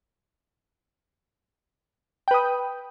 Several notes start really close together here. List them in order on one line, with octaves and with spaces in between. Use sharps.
G5 B4 D#6